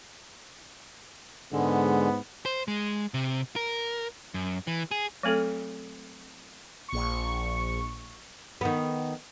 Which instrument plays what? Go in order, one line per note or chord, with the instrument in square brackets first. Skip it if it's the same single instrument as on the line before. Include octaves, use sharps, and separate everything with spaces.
[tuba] G#2 [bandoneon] D3 G#3 [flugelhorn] B3
[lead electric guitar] C5
G#3
C3
A#4
F#2
E3
G#4
[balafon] F#3 A3 C4 A4
[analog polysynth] A#1 C#6
[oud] D#3 B3